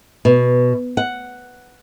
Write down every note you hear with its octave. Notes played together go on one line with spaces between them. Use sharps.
B2
F#5